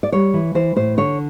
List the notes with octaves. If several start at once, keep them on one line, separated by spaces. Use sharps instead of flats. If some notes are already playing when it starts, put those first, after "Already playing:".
D5
G3 C#5
E3
E3 C5
A2 C5
D3 C#5